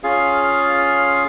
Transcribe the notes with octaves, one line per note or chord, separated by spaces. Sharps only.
C#4 F4 G#4 F5